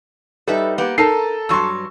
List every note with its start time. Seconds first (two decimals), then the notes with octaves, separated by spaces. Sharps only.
0.48 G3 D#4 A4 B4 E5
0.78 A#3 B3 G4
0.98 D#4 A4 A#4 A5 A#5 C7
1.49 G2 F#3 C6 C#6 E6